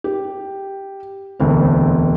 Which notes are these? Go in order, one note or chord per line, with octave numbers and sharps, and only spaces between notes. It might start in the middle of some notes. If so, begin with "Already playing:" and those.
G4
E1 D2 C4